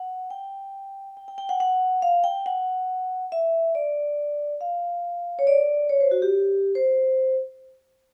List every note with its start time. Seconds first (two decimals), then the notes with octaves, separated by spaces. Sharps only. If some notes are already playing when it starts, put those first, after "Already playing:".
Already playing: F#5
0.30 G5
1.17 G5
1.28 G5
1.38 G5
1.49 F#5
1.60 F#5
2.02 F5
2.24 G5
2.46 F#5
3.32 E5
3.75 D5
4.61 F5
5.39 C#5
5.47 D5
5.89 C#5
6.00 C5
6.11 F#4
6.22 G4
6.75 C5